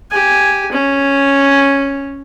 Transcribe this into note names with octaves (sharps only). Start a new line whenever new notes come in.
G4 G#5
C#4